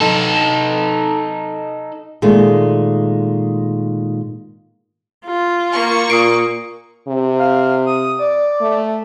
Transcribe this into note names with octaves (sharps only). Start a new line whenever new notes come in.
D#4 A4
A#2 D#3 G#3 A3
F4
A#3 C#6
A#2 D#6 C7 D7
C3
F5
D#6
D5
A3